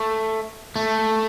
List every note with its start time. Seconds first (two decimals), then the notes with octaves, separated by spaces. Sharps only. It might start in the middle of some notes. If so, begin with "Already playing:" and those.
Already playing: A3
0.76 A3